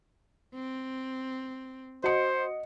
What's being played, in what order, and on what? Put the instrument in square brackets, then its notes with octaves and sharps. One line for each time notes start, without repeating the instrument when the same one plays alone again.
[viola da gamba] C4
[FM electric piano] F#4 [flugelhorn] C5 [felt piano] D#5 F#5 C#7